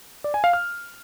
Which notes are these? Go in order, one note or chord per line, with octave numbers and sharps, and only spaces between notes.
D5
G#5
F5
F6